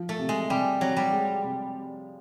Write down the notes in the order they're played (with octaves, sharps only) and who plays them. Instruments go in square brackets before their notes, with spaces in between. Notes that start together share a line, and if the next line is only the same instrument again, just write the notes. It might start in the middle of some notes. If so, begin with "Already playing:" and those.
Already playing: [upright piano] F3
[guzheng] A3
[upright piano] C3
[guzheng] G#3
[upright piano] C3 [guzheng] G3
[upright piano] C3 [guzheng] F#3
[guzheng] G3
[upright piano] G#3
C3